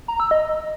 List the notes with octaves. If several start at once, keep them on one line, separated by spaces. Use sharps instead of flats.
A#5
E6
D#5